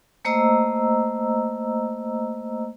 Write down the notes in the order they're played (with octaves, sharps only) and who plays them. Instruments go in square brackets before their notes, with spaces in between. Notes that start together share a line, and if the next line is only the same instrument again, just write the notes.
[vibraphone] A3 A#3 C5 D#5 A#5 E6